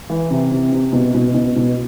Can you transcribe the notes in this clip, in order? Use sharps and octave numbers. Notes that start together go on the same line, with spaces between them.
E3
C3
C3
C3
B2
B2
B2
B2